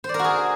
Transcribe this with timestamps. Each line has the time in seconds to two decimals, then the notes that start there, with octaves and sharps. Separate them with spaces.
0.04 C5
0.09 D5
0.14 A#4
0.19 F#4
0.24 G#4